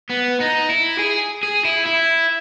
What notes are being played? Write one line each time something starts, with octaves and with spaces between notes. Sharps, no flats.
B3
D#4
E4
G#4
G#4
E4
E4